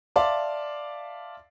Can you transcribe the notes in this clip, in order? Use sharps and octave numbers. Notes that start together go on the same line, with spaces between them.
D5 E5 F5 A5 C6 D6